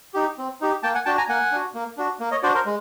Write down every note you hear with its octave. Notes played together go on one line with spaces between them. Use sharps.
D#4 G4
C4
D#4 G4
A#3 G5 A5
F#5 G#5
D4 F#4 G5 A5
G#5 A#5
A#3 F#5 G#5
D4 F#4
A#3
D4 F#4
A#3
C#5 D#5
D4 F#4 C5 D5
A#4 C5
G#3